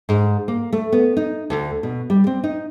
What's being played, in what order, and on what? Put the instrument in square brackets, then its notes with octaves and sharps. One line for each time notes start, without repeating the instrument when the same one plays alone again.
[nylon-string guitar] G#2
A#3
A3
B3
D#4
D2
B2
G3
C4
D#4